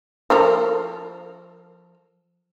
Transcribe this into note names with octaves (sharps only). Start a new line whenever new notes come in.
F3 A4 A#4